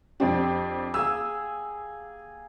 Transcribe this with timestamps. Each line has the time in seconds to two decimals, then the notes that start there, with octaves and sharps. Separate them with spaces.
0.20 F2 C4 D4 G4
0.94 A#3 G#4 G#5 E6